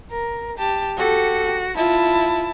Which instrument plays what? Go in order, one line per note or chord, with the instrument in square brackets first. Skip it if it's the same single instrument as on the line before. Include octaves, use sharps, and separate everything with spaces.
[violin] A#4
G4 A5
[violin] F#4 [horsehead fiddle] G4 A4
[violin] E4 A5 [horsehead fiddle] F4